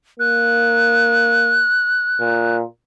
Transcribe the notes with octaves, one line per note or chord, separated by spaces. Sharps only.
A#3 F#6
A#2